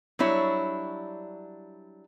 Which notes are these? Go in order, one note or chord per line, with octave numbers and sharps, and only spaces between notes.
F#3 G3 D4 E4 C#5